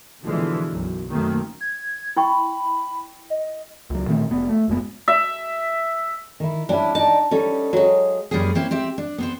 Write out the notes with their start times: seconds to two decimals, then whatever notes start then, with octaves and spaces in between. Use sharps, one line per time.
0.23 B2 D3 E3 F3 G#3
0.70 B1 F#2
1.09 F#2 D#3 A3 A#3 C4
1.61 G#6
2.16 E4 G5 B5 C#6
3.30 D#5
3.90 C#2 F#3
4.08 A#2 D#3 A3 C4
4.29 F1 B3
4.49 A3
4.68 F1 F#2 G#3 B3
5.08 E5
6.40 D#3 E4
6.69 G3 C#4 D4 E4
6.95 D#4 D5 A5
7.31 G3 C#4 D#4 A4
7.73 F#3 G#3 C5 F5
8.31 F#2 G3 A#3 C#4 G#4
8.55 A#3 C4 C#4 E4
8.71 C4 G4 E5
8.98 D4
9.18 B3 C4 C5